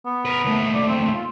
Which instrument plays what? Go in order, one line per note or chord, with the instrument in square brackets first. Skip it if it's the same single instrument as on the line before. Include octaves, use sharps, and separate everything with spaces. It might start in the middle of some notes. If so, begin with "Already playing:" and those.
[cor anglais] B3
[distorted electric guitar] A#4 B4
D#2 A3
[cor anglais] D5
C4
F4